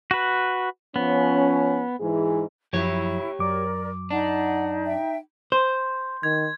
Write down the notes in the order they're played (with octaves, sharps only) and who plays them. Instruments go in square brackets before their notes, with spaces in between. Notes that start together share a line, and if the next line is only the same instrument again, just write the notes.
[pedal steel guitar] F#4 B4
[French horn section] F3 C#4 [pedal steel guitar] B3
[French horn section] G#2 E3 G#4
[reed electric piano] F#2 F3 F#3 [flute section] E4 [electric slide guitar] G4 C#5
[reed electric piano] F#2 F#3 D6 [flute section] A#4 D5
[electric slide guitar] D4 [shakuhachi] D#4 [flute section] F#5
[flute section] E5 G5
[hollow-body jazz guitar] C5 [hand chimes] C6 G6
[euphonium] D#3 [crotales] G#6